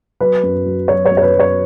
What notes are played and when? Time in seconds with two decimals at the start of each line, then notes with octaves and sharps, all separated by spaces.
0.20 F#3 B4
0.43 F#2
0.66 F#3
0.88 F#3 C#5
1.06 C#5
1.11 F#2
1.17 C#5
1.23 B4
1.34 F#3
1.39 C#5